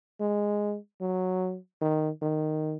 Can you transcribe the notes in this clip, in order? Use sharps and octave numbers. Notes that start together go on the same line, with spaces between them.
G#3
F#3
D#3
D#3